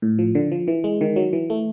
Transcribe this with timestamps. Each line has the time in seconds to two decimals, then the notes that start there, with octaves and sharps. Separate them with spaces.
0.02 A2
0.19 F3
0.35 D3
0.51 F3
0.68 E3
0.84 G#3
1.01 D#3
1.16 F#3
1.33 E3
1.50 A3